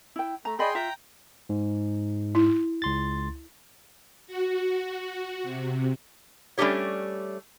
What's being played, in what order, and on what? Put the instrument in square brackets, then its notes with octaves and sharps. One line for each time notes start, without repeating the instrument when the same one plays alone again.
[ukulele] E4 G5
[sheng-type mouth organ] A3 [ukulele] A#5
[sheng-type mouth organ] G#4 G5 C6 [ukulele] D5 D#5 B5
[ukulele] F4 E5 [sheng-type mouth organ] G5 A#5
[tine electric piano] G#2
[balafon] E4
[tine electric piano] C#2 C6 A6
[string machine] F#4
C3
[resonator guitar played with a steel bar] G3 A3 C#4 D4 G4 C#5